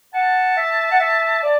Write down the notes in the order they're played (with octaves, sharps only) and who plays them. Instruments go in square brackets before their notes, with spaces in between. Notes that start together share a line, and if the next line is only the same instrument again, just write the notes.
[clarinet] F#5 [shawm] A5
[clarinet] E5
F#5
E5
D5